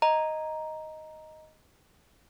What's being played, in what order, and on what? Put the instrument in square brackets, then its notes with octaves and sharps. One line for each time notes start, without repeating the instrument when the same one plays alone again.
[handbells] D#5 A#5